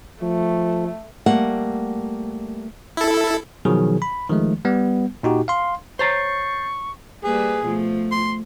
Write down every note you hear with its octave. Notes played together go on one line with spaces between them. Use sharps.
F3 A3
G3 A3 A#3 F#5
E4 A4
B2 D#3 F3 F#3 G#4
B5
D#3 F3 G#3 A3
G3 B3
A#2 D#4 F#4 G4
F5 C6
C5 C#5 A#5 C#6 G6 A6 C7
G3 A#3 G#4 B4
B2 F3 A3
C6